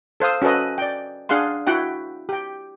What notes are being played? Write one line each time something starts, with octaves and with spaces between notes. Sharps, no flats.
A4 C5 F5 D#6
C#4 F#4 A4 B4 D#5
D5 G5
D4 G#4 F5 F#5 C6
E4 F#4 F#5 G5
G4 G5